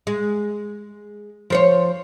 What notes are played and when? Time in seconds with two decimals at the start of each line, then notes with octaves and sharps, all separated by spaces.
0.07 G#3
1.50 F3 C5 C#5